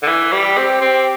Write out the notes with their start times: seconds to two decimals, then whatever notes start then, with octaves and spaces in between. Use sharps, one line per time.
0.03 D3
0.07 E3
0.32 G3
0.44 G4
0.57 C4
0.81 C4